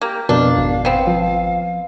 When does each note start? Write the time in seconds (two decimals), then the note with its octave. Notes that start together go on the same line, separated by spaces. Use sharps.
0.01 A#3 G4
0.29 F2 B2 D4 A#4 D5 F5
0.58 G#1
0.85 B3 C4
1.07 F3